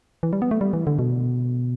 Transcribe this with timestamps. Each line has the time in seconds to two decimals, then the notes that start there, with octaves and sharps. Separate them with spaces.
0.23 E3
0.33 G3
0.42 B3
0.51 A3
0.61 G3
0.73 E3
0.87 D3
0.99 B2